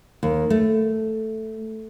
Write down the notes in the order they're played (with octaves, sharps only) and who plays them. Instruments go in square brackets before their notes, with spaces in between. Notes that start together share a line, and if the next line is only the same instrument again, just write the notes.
[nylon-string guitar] D#2
A3